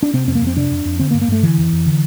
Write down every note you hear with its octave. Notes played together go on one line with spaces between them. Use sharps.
D4
C3 C4
F2 C4
A#3
F2
C4
C3 D4
F2
F2
D3 C4
A#3
G2
A#3
G2 A3
D3 E3
F2
F2
D3